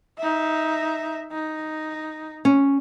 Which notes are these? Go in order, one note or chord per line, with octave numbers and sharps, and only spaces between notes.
D#4 E5
D#4
C#4